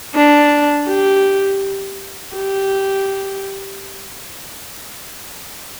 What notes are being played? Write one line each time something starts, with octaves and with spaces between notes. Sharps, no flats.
D4
G4
G4